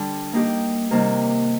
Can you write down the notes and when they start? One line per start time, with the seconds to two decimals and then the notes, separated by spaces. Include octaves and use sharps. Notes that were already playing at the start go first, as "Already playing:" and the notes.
Already playing: D3 G3 D4
0.33 A#3 D#4 G4
0.91 C3 D#3 G3 A#3